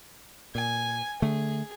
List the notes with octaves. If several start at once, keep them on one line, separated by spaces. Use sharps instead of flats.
A#2 G#5
D3 A3 G#4